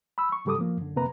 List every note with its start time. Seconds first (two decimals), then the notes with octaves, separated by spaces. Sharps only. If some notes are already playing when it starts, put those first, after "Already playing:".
0.18 B5 E6
0.32 C#6
0.45 G#2 C#3 G3 A4 D6 D#6
0.59 F3 A#3
0.77 F#2 D3
0.96 F2 C3 A#3 B4 A#5